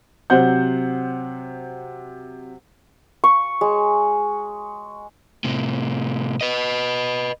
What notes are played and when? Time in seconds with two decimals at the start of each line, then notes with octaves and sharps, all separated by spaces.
0.30 C3 F#3 C5 F#5 G6
3.24 C#6
3.61 G#3
5.44 A2 C3
6.41 B4 D#5